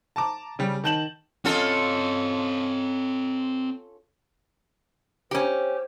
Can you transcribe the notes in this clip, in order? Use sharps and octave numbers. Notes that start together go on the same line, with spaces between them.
A5 A#5 D6
C#3 G3
D#3 A5 G6 E7 F#7
C4 C#4 F4 A4 D#5
C#4 G4 C5